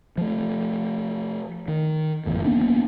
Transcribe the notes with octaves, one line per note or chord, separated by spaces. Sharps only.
F3 A3
D#3
F#1 E2 A2
A#3 B3 C#4 D4